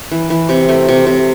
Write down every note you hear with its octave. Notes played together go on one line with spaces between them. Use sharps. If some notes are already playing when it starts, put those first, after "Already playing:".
E3
E3
C3
A3
C3
C3